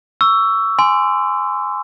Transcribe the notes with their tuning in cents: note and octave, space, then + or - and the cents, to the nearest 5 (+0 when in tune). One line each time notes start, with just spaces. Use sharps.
C#6 +25 E6 +10
G#5 +0 C6 -15